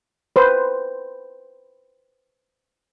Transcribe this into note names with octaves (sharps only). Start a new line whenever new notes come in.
B4 C5